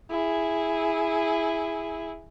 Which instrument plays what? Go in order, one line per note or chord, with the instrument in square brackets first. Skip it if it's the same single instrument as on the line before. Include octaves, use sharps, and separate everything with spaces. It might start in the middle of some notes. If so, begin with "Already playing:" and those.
[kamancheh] E4 G#4